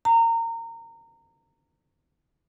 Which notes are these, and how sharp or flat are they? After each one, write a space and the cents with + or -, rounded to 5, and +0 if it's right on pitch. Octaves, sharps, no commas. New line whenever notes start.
A#5 -25